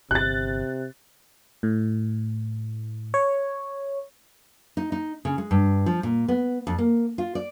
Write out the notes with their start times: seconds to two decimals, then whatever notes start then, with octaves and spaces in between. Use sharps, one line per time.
0.11 G1 C3 F#6 A6
1.63 A2
3.14 C#5
4.77 D#4
4.92 D#4
5.25 C#3
5.38 G#3
5.51 G2
5.86 F3
6.03 A#2
6.28 B3
6.67 F2
6.78 A#3
7.18 F4
7.35 D5